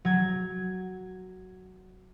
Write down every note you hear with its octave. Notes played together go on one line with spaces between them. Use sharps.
F#3 G#6